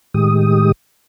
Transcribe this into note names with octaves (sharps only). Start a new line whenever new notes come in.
A2 D#3 G#3 G4 D#6